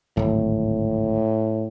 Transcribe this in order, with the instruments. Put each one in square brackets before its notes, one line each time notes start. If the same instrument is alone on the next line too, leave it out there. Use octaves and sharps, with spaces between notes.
[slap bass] D1 G#1 [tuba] A2